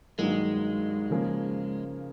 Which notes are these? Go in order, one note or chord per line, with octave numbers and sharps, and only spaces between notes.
G2 D#3 F#3 G#3 A#3
C#3 F3 A#3 C#4